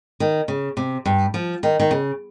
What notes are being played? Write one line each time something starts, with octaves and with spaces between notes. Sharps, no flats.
D#3
C#3
C3
G2
F3
D#3
D#3
C#3